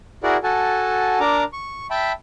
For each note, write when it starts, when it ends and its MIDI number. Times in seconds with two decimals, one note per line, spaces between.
0.23 0.37 64
0.23 0.37 66
0.23 0.37 68
0.23 0.37 70
0.23 0.37 74
0.23 0.37 78
0.43 1.19 66
0.43 1.19 69
0.43 1.19 78
0.43 1.19 80
0.43 1.19 81
1.20 1.44 62
1.20 1.44 70
1.20 1.44 82
1.20 1.44 86
1.53 1.87 85
1.90 2.12 76
1.90 2.12 79
1.90 2.12 81
1.90 2.12 83